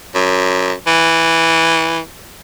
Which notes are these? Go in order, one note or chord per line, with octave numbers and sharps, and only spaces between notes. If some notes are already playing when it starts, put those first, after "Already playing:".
F#2
E3